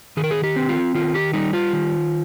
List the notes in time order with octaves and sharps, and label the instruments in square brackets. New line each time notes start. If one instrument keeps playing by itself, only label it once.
[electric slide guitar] D#3 G#4
A#4
G#4
G4
C4
F4
D#3 F4
G4
G3 D#4
F4
D#3